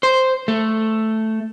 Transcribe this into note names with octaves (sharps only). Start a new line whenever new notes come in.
C5
A3